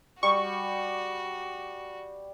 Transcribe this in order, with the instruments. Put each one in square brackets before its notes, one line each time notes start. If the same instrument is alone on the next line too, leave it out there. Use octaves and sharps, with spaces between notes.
[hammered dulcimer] G3 [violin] F#4 [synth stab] C#6